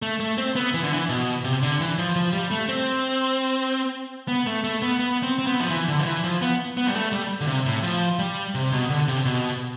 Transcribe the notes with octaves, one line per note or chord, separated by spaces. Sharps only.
A3
A3
C4
B3
E3
D3
E3
B2
C3
D3
E3
F3
F3
G3
A3
C4
B3
A3
A3
B3
B3
C4
C4
B3
F3
E3
D3
F3
E3
F3
B3
B3
G3
A3
G3
D3
C3
A2
F3
G3
C3
B2
D3
C3
B2